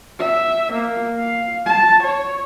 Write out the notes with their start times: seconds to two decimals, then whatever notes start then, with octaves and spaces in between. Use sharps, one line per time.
0.19 E5
0.72 A#3
1.19 F5
1.66 A5
2.03 C#5